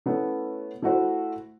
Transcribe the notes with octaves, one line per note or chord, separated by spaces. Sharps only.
A3 B3 C#4 E4
A3 E4 F#4 C5